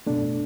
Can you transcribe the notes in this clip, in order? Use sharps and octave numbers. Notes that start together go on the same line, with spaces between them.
B2 A3 D4